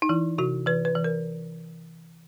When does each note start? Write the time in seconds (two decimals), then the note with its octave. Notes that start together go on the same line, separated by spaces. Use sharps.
0.02 D#4
0.09 E3 E4
0.38 C3 F#4
0.66 E3 B4
0.85 B4
0.95 E3
1.04 A#4